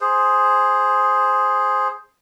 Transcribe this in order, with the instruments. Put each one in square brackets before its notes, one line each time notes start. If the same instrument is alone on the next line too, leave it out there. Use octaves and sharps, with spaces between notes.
[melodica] G#4 C5